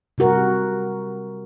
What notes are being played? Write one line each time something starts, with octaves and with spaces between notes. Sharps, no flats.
C3 G3 F#4 A#4